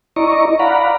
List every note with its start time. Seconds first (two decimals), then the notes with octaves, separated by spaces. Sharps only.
0.16 E4 D5 D#5 A#5 C#6
0.59 D5 F5 F#5 A#5 B5